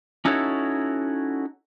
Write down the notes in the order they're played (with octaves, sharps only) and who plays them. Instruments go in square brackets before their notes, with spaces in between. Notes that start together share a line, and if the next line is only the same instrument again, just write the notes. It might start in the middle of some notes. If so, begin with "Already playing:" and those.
[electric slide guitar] C#4 D#4 E4 F#4 A4 C#5